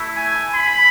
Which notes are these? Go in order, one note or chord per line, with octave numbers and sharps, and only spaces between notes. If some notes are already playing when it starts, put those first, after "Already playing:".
Already playing: A3 E4
G#5
B5